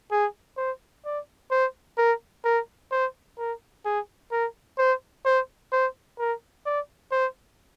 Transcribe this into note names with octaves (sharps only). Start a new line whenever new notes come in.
G#4
C5
D5
C5
A#4
A#4
C5
A#4
G#4
A#4
C5
C5
C5
A#4
D5
C5